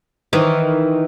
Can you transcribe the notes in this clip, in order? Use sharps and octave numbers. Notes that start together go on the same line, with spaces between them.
D#3 E3